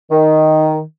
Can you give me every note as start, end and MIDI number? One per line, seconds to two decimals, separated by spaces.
0.11 0.80 51